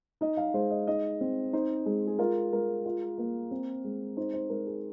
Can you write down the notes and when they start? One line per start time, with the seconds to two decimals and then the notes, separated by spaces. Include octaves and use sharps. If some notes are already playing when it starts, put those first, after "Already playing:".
0.21 D#4 D#5
0.37 F5
0.54 G#3 C5
0.71 D#5
0.87 D#4 D#5
1.21 C4
1.53 D#4 C5
1.86 G#3
2.07 G#4
2.19 F4 A#4
2.52 G#3 A#4
2.86 F4
3.18 A#3
3.51 C4
3.84 G#3
4.17 D#4 C5
4.34 C5
4.50 G#3 A#4
4.67 G#4